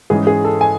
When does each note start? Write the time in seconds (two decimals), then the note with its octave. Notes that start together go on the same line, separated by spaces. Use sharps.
0.10 G#2 E3 G#3 C#4 G#4
0.27 G#4
0.45 A4
0.61 G#5